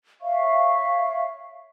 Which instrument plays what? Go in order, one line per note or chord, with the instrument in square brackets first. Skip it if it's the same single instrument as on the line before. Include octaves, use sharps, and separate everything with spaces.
[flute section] C#5 E5 F5 C#6